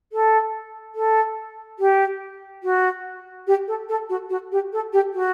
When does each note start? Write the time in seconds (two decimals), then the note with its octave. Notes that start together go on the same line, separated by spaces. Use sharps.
0.13 A4
0.95 A4
1.79 G4
2.63 F#4
3.47 G4
3.68 A4
3.89 A4
4.09 F#4
4.30 F#4
4.52 G4
4.73 A4
4.93 G4
5.13 F#4